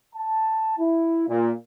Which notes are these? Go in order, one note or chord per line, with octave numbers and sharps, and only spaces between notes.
A5
E4
A#2